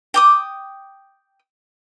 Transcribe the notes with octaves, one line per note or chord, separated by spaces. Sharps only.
G5 D6 D#6